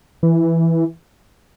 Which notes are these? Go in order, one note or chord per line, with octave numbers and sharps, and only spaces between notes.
E3